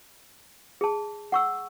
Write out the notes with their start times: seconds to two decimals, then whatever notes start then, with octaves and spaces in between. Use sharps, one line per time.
0.81 G#4 A5
1.32 F#5 C#6 E6